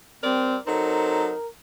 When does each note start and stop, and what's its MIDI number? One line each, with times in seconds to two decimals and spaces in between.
0.23 0.57 55
0.23 0.56 60
0.23 0.57 70
0.23 0.57 74
0.67 1.32 54
0.67 1.32 60
0.67 1.34 63
0.67 1.32 69
0.67 1.48 70